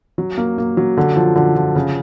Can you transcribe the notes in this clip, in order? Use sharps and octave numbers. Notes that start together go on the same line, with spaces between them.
F#3
A#3
A#3
F#3
D3
F3
D3
F3
C#3